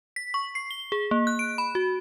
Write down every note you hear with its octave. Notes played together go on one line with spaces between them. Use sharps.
B6
C#6
C7
G7
G#4
A#3
F#6
D7
B5
F#4